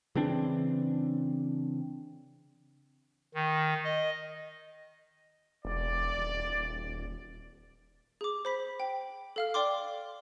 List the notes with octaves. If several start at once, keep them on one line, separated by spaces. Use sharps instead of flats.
C#3 E3 C4 D4
D#3
D#5
E1 D5
D#1
G#4 D6
C5 B5 B6
G5
A4 F5 F6
D5 G5 C6 D6